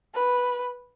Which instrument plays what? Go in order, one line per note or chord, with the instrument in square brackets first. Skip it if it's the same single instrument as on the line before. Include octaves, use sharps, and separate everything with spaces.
[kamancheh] B4